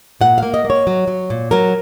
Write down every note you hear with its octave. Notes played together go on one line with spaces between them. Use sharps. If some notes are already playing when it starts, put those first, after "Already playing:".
A#2 F#5
A#3 F5
D#5
A#3
C#5
F#3
F#3
A#2
F#3 A#4